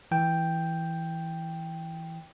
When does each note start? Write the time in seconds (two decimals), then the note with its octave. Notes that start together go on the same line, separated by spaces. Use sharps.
0.11 E3 G5